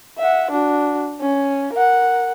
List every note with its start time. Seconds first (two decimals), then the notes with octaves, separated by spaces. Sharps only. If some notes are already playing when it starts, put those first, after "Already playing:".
0.18 E5 F#5
0.51 D4 F#4
1.21 C#4
1.73 A#4 F#5